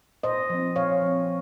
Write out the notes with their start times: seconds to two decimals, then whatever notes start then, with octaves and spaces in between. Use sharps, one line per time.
0.23 A#2 C5 D#5
0.50 F3 C4
0.76 A#2 C#5 F5
1.02 F3 C4